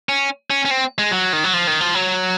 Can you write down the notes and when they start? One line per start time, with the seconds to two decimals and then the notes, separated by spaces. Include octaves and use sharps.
0.09 C#4
0.50 C#4
0.65 C#4
0.71 C4
0.98 G#3
1.11 F#3
1.33 D#3
1.44 F#3
1.54 F3
1.67 D#3
1.81 F3
1.95 F#3